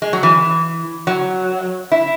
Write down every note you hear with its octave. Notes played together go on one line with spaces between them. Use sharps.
G#3
F#3
E3
F#3
E4